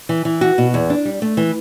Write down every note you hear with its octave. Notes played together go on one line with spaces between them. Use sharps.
E3
E3
F#4
B2
E2
D4
G3
A3
E3